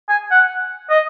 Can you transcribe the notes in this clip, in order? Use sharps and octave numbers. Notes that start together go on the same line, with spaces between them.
G#5
F#5
D#5